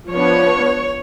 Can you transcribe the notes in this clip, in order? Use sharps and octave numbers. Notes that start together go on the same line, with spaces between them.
F3 B3 D4 C#5